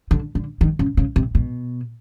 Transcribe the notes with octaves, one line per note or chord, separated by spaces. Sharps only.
D3
D3
D#3
C#3
C#3
C3
B2